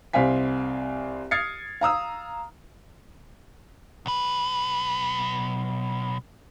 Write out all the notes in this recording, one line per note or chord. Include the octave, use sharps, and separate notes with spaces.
C2 C4 F5 G#5 B6
D#6 F6 G#6 A6 C7 C#7
F5 A#5 D#6 E6
B1 B4